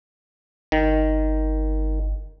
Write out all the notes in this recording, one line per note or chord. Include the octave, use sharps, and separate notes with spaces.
G1 D#3